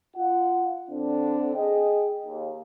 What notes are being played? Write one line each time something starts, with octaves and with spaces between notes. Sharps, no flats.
F4 F#5
D3 C4 D4
G#4 D#5 G5
D#2